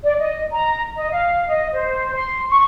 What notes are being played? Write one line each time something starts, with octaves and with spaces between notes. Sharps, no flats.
D5
D#5
A#5
D#5
F5
D#5
C5
C6
C#6